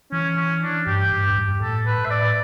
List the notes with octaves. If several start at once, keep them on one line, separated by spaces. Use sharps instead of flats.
E3 C#4
C#4
D4
G2 G4
G2
F#2
G2
A2 A4
B4
A2
E5
D5